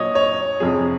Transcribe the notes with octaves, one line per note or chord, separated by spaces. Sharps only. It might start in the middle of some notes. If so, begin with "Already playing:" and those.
Already playing: A#2 F#3 C#5 D#5
C#5
F2 C3 F3 G#4